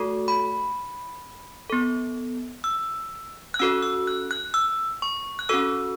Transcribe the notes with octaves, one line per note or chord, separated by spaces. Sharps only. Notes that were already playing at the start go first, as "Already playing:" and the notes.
Already playing: A3 F#4 A4
B5
B3 A4
E6
F#6
C#4 F#4 A4 E6
E6
F#6
F#6
E6
C#6
F#6
C#4 F#4 A4 E6